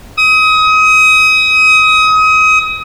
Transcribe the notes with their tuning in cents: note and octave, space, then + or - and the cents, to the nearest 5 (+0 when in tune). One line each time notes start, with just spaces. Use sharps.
D#6 +30